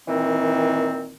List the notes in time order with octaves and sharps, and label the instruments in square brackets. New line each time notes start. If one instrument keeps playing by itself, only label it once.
[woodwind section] A#2 D#3 E3 C4